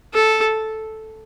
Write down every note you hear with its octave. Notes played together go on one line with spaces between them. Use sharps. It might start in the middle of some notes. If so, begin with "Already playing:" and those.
A4